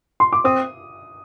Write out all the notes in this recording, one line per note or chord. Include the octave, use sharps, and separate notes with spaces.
C6
D6
C4 D#6